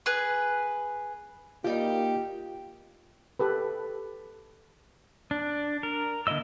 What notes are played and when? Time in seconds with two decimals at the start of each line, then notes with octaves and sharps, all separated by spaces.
0.06 G#4 B4
1.64 G3 A#3 D#4 F4 G4 G5
3.40 G4 A4 B4
5.31 D4
5.83 A#4
6.27 D3 A#3 E4 D#5 E6